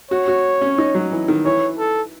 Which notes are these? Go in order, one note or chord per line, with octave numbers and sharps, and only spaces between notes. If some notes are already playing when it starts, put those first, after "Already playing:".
F#4 C#5
F#4
C#4
D#4
F#3
E3
D#3
E3 C#5
A4